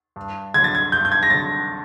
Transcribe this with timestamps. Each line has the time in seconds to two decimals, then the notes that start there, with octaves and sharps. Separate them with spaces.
0.16 G2
0.54 D3 F#3 G#6
0.64 A6
0.75 G#6
0.92 G2 G6
1.05 G6
1.12 G#6
1.23 A#6
1.30 D3 F#3 A6